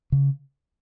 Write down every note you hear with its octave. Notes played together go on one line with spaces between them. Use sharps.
C#3